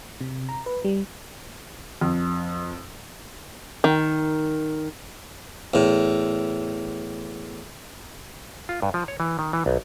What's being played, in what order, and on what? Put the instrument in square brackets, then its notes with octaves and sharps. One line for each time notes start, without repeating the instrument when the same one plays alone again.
[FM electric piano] C3
A#5
B4
G3
[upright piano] F2
[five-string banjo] D#3
[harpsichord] E2 A2
[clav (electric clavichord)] F4
G2
F3
C#5
E3
D#3
E3
B1